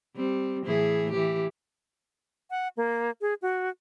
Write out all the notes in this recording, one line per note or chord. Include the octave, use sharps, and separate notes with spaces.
G3 C4
A2 E3 G#4
E3 G4
F#5
A#3
G#4
F#4